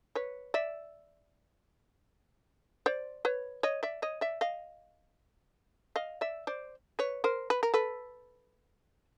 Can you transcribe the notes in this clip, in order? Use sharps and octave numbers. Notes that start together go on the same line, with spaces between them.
B4 C#5
D5 E5
C5 D5
B4 C#5
C#5 D#5
D5 E5
C#5 D#5
D5 E5
D#5 F5
D#5 F5
D5 E5
C5 D5
B4 C#5
A#4 C5
B4
A#4
A4 B4